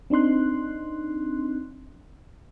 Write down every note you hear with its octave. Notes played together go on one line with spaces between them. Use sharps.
C4 D4 D#4 C6 F#6